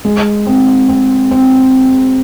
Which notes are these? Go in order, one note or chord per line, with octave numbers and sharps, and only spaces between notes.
G#3
C4
C4
C4